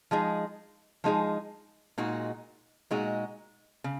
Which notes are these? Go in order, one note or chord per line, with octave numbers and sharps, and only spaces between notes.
F3 G#3 D#4 G#4
F3 G#3 D#4 G#4
A#2 G#3 D#4 F#4
A#2 G#3 D#4 F#4
C#3